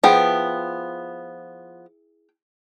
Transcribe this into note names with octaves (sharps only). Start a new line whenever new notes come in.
F3 B3 E4 G#4 G5